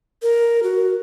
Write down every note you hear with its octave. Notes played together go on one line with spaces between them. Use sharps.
A#4
F#4